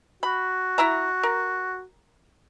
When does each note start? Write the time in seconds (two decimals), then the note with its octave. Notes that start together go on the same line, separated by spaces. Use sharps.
0.23 F#4 B5
0.78 E4 E5 A#5
1.23 A#4